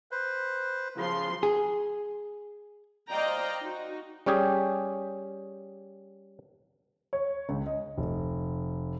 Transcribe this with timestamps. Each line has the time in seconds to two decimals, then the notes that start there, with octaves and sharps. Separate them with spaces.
0.11 B4 C5
0.97 C#3 F3 C6
1.43 G#4
3.10 C5 D5 D#5 F5 G5 A#5
3.63 D#4 F#4
4.26 G3 C#4 G4 G#4
7.13 C#5
7.49 C#2
7.67 D#5
7.97 F1